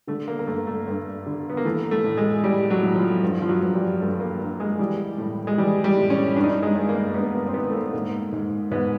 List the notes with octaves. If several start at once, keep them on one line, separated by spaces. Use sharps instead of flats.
D3 A3
A#3
A#3
G2 A3
A3
G2
D3
B3
A#3
E3 A3
A3
A2
G#3
A2 G3
F#3
A2
F3
G2
F3
F#3
G2
G3
G2 A3
A#3
G2
G#3
E3 G3
A2
G#3
E3 G3
G3
A2
C#4
G2 D4
D#4
D4
G#3
G2
A#3
A#3
G2 B3
B3
A#3
C4
D#3 B3
A3
A#3
G#2 A#3
G#2
G#2 B3